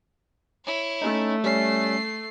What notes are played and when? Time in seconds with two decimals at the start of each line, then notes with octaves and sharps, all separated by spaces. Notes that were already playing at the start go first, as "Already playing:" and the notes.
0.65 E4 C#5
1.02 A3 C#4 D#4
1.44 G3 C#4 C7